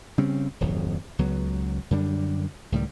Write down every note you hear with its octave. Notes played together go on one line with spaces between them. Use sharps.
C#3 G3 C4 C#4
D#1 G#1 F2 F#3
C#2 F#3 B3
F#2 D3 G3 D4
C#2 A2 D#3 G3